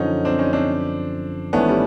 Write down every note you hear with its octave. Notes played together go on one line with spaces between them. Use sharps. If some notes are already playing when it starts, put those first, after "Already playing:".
Already playing: F#2 D3 F3 C#4 D#4
C4 D4
C#4 D#4
C4 D4
G#1 G#2 E3 A3 B3 C#4 D4
G3